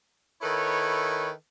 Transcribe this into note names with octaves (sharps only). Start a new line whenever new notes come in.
D#3 E4 A4 B4 C#5